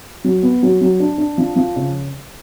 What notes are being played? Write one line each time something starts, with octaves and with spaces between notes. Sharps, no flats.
F#3
B3
F#3
F#3
D4
D4
F3
F3
C#3